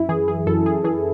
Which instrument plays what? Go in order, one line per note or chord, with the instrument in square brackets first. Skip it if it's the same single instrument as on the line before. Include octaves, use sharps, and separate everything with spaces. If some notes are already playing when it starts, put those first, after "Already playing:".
Already playing: [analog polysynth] F#2 E4
E3 G#4
G#4
F#2 A4
G#4
E3 G#4